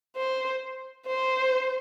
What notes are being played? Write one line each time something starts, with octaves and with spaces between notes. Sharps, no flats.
C5
C5